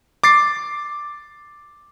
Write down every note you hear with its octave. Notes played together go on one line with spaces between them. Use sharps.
D6 A6 C7